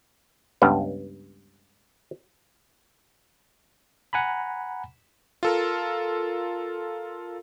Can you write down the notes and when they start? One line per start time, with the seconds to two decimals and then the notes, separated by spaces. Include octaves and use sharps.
0.62 C#2 G2 B3
4.13 F#5 G#5 A#5 B5
5.43 F4 A4 A#4